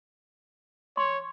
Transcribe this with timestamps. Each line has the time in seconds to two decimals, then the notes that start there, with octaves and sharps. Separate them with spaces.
0.97 C#5 C6 C#6